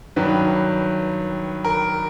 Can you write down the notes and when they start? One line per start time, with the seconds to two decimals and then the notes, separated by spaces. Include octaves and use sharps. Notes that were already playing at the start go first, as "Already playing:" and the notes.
0.16 G2 D#3 F#3 B4
1.65 A#4